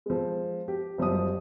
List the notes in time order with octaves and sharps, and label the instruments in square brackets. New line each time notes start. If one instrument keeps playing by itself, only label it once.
[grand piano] F3 G#3
G4
F#1 F3 G3 D#6